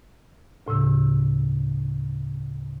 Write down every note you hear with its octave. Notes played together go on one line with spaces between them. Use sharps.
D2 A2 C#3 E6